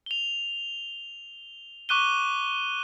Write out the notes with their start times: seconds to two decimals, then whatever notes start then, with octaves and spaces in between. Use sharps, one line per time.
0.06 F7 G7
1.89 C#6 D6 F#6 D#7 G7